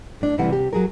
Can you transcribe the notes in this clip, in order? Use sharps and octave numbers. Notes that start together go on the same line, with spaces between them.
A2 D4
A2 C3 E3 G3 E4 F#5
C3 G4
F#3 G#4 A#4